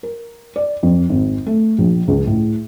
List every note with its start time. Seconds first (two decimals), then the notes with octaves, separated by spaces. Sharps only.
0.03 A#4
0.56 D5
0.83 F2
1.09 G#1
1.46 A3
1.78 A#1
2.08 C#2
2.27 A2